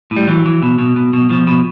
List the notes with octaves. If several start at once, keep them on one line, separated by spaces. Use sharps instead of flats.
A2
G3
E3 F#3
E3
B2
B2
B2
B2
B2 F3
B2